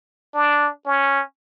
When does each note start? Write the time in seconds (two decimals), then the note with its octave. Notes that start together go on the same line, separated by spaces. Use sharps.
0.34 D4
0.86 C#4